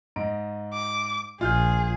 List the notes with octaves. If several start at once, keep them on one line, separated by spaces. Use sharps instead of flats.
G#2 D#5 D7
D6
A#1 F4 G#4 F6 G6